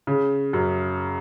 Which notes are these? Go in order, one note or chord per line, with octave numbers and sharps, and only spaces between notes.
C#3
F#2